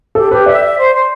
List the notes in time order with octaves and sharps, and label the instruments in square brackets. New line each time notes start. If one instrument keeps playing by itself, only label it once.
[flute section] G4 [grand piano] A4
[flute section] G4 [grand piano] B4
[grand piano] D5 [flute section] E5
[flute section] E5
C5
C5